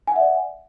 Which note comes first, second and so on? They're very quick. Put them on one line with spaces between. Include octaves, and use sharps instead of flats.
G#5 F#5 E5 D5